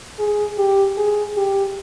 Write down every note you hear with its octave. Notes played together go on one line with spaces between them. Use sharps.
G#4
G4
G#4
G4